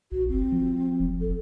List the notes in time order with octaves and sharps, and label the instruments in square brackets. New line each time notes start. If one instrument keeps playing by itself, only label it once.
[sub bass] A#1 [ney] F#4
[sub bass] F#1 [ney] C4
[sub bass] F3
E1
[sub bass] F#1 [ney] A4